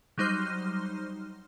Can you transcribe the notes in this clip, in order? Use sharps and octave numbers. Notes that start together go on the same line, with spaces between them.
F#3 G3 D#4 C5 C6 F6